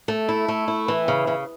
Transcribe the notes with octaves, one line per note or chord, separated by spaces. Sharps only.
A3
E4
A3
E4
E3
C#3
C#3